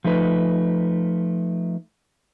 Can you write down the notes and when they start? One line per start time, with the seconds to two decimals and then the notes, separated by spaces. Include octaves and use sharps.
0.04 F3 A3 D#4 B4